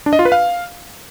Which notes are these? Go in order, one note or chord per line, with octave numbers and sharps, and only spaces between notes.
D4
D#5
F4
B4
F5